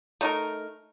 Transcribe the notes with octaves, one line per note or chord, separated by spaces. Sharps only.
A3 D#4 A#4